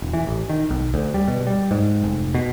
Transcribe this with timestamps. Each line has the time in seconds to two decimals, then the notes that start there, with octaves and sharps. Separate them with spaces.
0.02 D#1
0.13 E3
0.27 A1
0.49 D#3
0.70 B1
0.94 D2
1.14 G3
1.28 B2
1.47 G3
1.71 G#2
2.03 F1
2.34 B2